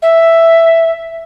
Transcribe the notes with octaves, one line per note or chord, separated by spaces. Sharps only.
E5